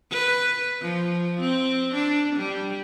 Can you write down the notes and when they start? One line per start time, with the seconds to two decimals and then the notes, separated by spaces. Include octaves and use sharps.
0.12 B4
0.82 F3
1.41 C4
1.95 D4
2.36 G3